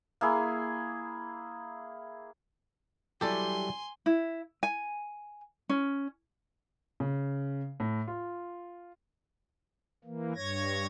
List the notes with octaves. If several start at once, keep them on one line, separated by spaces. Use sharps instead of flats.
A#3 E4 G#4
F#3 G3 E4 G4 A4 D5 G#5 C6
E4
G#5
C#4
C#3
A2
F4
E3 A#3
G2 C#5 G#6 A#6